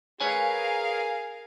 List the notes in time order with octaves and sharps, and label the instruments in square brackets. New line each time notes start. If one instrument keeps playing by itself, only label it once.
[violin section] G#4 A#4 F5 [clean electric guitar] B4 C#5 G#5